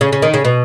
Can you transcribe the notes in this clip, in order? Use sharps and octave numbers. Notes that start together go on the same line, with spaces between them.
C#3
C#3
D#3
C#3
B2